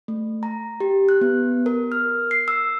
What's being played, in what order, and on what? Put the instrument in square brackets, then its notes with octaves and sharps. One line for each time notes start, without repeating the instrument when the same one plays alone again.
[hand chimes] A3
A#5
G4
F#6
B3
A#4
F6
C7
E6